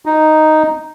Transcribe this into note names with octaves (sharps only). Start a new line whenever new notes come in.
D#4